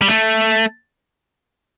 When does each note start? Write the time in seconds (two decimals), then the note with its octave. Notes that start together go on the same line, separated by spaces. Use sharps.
0.02 G3
0.08 A3